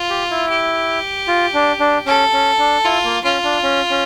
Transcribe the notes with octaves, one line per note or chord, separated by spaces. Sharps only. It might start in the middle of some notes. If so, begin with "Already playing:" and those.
Already playing: F4
G4
E4
G4
F4
D4
D4
C#4 A4
C#4
D4
E4 F4
A#3
C#4 F4
D4
C#4
C#4